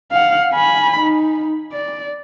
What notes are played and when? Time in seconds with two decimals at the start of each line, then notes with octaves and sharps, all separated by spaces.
0.11 F5 F#5
0.53 G#5 B5
1.00 D#4
1.72 D5